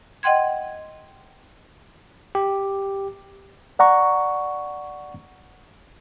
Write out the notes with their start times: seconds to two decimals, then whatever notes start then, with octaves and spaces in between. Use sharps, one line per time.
0.23 D#5 F#5 G5 C6 G#6
2.35 G4
3.79 D5 F#5 A#5 C#6